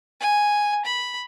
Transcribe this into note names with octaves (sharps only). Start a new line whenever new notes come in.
G#5
B5